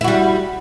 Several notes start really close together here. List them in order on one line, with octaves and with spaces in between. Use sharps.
E4 F#4 G3